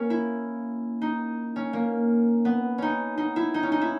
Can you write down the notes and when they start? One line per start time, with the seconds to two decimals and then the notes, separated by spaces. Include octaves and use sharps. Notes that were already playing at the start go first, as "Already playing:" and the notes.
Already playing: A#3 C#4
0.10 E4
1.01 D#4
1.56 C#4
1.73 A#3
2.45 B3
2.78 C#4 D#4
3.17 D#4
3.36 E4
3.54 D#4
3.63 C#4
3.72 D#4
3.81 E4